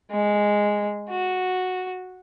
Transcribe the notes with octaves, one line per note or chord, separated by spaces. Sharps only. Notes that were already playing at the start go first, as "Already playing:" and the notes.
G#3
F#4